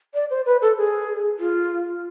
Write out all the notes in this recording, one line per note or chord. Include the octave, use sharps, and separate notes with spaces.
D5
C5
B4
A4
G#4
F4